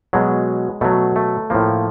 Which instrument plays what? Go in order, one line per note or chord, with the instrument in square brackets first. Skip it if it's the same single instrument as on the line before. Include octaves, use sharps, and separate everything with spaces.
[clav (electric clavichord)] B2 F#3 G#3
B2 F#3 A3
A3
A2 F3 A#3